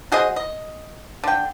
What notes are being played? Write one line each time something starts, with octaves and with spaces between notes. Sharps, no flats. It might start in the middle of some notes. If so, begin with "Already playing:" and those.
F#4 G#4 C5 D#5
D#5
D3 G5